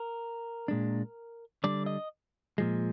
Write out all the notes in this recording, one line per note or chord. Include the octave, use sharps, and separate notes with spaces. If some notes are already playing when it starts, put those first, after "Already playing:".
Already playing: A#4
A#2 G#3 D4
D3 G3 D4 D5
D#5
A#2 F3 G#3